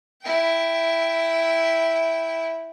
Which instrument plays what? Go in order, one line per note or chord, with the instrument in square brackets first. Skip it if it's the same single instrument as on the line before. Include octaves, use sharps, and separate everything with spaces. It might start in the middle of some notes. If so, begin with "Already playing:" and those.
[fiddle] E4 G5